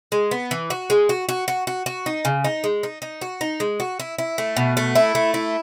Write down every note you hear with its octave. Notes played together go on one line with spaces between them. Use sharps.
G#3
B3
E3
F#4
G#3
F#4
F#4
F#4
F#4
F#4
D#4
C#3
D#4
G#3
D#4
D#4
F#4
D#4
G#3
F#4
E4
E4
A3
B2
A3
E4
A3
E4